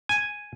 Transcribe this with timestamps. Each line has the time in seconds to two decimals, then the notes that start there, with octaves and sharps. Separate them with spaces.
0.09 G#5